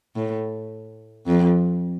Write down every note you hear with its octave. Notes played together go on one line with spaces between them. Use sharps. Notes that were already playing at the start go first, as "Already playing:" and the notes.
A2
F2